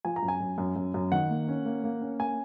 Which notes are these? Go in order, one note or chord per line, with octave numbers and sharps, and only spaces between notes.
F3 G#5
A#5
F#2
G#5
F#2
F#2
F#2
F#2
D#3 F#5
A#3
C#4
A#3
A#3
C#4
A#3 G#5